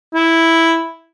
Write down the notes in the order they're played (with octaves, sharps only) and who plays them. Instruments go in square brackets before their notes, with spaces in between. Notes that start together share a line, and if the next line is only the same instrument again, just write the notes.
[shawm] E4